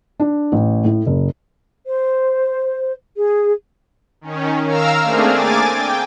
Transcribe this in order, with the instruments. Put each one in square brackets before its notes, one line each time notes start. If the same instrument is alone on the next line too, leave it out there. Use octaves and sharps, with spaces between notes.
[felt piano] D4
A1
A2
F#1
[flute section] C5
G#4
[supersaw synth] D#3 C#4
A#4 F5 A#5 E6 F6
A3 A#3 C4 D4 G#4
G#5 D6 A6
G5